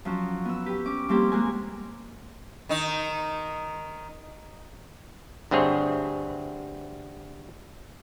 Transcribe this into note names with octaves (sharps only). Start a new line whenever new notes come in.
F3 F#3 C#4 F#4
B3 E6
G4 B4
C#4 D6
F3 G3 A#3 C4 G4
G#3 A#3 F#4 G#5
D#3 D#4
D2 G2 C4 G#4 C#5